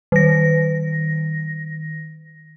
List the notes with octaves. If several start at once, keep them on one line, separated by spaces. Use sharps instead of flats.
D#3 A#6